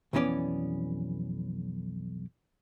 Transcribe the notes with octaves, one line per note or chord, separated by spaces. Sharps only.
B1 F2 E3 B3 C#4 D5